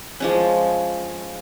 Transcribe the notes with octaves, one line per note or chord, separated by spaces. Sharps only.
F3 G#3 C#4